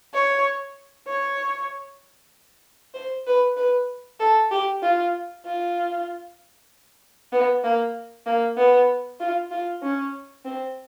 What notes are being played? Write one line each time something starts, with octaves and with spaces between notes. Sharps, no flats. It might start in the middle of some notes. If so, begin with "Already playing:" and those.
C#5
C#5
C5
B4
B4
A4
G4
F4
F4
B3
A#3
A#3
B3
F4
F4
C#4
C4